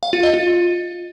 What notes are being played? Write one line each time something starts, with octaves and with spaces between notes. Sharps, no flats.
F5
F4
D#5
F4